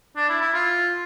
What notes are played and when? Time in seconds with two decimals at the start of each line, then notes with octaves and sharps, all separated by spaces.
0.16 D4
0.29 E4
0.41 E4
0.54 F4